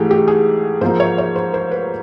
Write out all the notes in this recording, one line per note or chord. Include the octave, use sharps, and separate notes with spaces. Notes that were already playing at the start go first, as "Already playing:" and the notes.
Already playing: G#2 E3 A3 G4 G#4
G4
G#4
G#2 F3 A#3 C5
C#5
C#5
C5
C5
B4